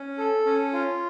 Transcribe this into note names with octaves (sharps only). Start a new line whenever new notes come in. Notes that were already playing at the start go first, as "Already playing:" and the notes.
Already playing: C#4
A4
C#4
F4